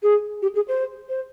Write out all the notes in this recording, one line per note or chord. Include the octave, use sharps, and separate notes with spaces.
G#4
G4
G#4
C5
C5